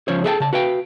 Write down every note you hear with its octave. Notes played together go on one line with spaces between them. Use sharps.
C#2 F3 C#4 C5 C#5
G#4 A4 D#5 E5 G5 A5
C#3 A5
F#4 B4 F5 G5